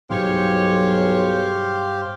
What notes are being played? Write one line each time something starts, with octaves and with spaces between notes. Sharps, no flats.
B1 E2 G2 G#3 G4 C5 C#5 F5